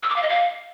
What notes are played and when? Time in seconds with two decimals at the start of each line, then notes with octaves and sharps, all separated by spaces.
0.03 E6
0.10 D6
0.16 F5
0.23 D#5
0.29 F5